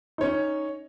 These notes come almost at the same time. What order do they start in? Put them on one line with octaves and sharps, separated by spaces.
D#4 C#5 C#4